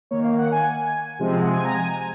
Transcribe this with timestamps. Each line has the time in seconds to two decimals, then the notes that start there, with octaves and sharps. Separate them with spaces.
0.11 D#3 A#3 C#5
0.24 F5
0.38 F#5
0.52 G#5
1.19 C3 F3 G#3 C4
1.42 F#5
1.47 G#5
1.64 A#5
1.74 G#5